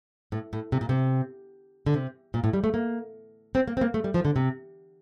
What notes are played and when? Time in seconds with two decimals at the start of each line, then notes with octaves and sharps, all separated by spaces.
0.32 A2
0.53 A2
0.72 C3
0.81 A#2
0.89 C3
1.86 D3
1.94 C3
2.34 A#2
2.44 A2
2.53 G3
2.64 A3
2.74 A#3
3.55 C4
3.68 A#3
3.77 C4
3.81 A#3
3.94 A3
4.04 G3
4.14 F3
4.25 D3
4.36 C3